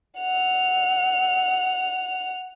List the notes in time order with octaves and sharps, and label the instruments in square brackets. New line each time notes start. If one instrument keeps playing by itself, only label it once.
[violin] F#5 F7